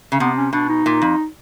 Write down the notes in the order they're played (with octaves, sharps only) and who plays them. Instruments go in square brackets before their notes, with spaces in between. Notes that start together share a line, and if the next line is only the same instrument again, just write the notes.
[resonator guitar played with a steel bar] C#3
[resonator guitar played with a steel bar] C3 [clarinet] B3
[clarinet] C#4
[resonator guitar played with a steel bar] B2 [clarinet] D4
[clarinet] D#4
[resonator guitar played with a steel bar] A#2
F2